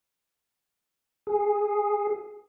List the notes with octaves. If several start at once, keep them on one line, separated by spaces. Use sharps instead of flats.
G#4